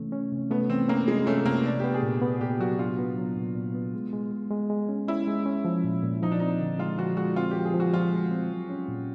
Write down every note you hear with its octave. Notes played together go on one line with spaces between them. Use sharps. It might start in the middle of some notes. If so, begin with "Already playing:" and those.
Already playing: C3 E3 A3 C#4
C#4
C3
A3 B3
E3 C4
A#3 C#4
C3 G#3
A3 C#4
C3 A#3
B3 D4
B3 G4
G#4
A#2
B3
A#2 G4
F#3 F#4
D4 F4
B3
F#3
A#2
A#2
B3
G#3
G#3
G#3
G#3
G#3
C#4
C#4 E4
G#3
C#4
F3
A#2
A#2
F3 D#4
D4
C4 D#4
D3
G#3 F4
F3 F#4
G#3 F#4
C4 F4
F3 G4
G#4
F3
F#4
F3 F4
G#3
C4
F#3
C#4
A#2